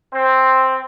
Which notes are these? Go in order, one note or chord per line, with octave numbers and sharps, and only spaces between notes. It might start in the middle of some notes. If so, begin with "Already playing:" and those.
C4